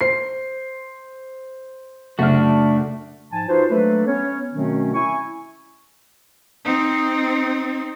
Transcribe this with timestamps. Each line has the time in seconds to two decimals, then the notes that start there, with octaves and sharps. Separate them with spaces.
0.01 C5 C7
2.19 F#1 A3 D4 F#4 E5 F6
3.32 G#2 F3 G#5 A5
3.48 D#4 F4 F#4 B4 C5
3.69 F#3 A3 A#3 D4 A4 B4
4.06 B3 C#4 C#5
4.53 B2 D#3 F#3 A3 C4 C#4
4.94 E4 G#5 C#6
6.65 C4 D#4